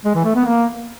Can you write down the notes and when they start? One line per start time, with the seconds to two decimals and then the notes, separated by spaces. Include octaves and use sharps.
0.05 G#3
0.15 E3
0.25 A3
0.35 B3
0.45 A#3